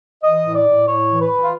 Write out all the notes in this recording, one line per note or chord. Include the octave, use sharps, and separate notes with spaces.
E3 D#5
A2
D5
A2
A2 C#5
E3
B4
E3
F4